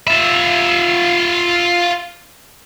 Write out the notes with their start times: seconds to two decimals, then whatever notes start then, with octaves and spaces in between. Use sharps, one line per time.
0.08 F4 E5